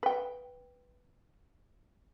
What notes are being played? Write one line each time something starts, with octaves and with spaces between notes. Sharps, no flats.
B4 G5